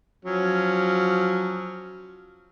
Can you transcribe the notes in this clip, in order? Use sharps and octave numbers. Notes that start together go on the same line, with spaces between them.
F3 F#3 C#4